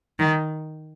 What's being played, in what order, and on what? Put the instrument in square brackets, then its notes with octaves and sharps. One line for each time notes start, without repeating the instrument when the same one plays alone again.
[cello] D#3